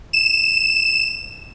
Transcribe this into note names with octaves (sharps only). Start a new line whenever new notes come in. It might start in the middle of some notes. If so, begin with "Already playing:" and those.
E7